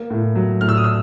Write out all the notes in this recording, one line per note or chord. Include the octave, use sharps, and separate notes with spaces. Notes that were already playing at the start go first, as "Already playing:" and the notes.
Already playing: A#3
A2
F#3
A2 F6
E6
D#6
E6